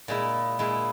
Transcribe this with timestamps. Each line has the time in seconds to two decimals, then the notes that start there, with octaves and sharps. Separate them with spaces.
0.08 A#2 G#3 E4
0.59 A#2 G#3 E4